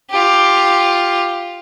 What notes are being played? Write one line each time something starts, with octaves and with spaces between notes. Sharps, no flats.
F4 G4